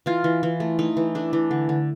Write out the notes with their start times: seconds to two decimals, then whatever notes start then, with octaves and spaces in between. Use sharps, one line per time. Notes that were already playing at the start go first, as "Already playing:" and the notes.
0.06 E3 F4
0.24 E3
0.43 E3
0.60 A3
0.79 A3 D#4
0.97 E3
1.15 A3 D4
1.33 E3
1.51 D3
1.69 D3